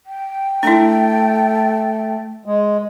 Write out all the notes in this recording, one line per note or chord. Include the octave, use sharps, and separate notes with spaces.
G5
A3 D4 E4
G#3